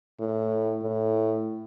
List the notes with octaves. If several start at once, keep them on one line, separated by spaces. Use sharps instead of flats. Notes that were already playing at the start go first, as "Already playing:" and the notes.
A2
A2